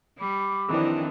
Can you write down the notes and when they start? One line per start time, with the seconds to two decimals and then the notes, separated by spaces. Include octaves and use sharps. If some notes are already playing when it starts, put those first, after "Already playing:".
0.18 G3 B5 D6
0.69 F2 D#3 E3 C4 D4